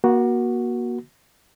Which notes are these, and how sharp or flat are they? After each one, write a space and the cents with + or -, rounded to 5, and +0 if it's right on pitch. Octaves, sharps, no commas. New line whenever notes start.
A#3 +35 F#4 +0